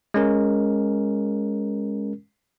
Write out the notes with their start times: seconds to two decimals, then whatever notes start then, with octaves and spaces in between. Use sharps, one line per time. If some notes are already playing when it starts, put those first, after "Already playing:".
0.14 G#3 C#4 A#4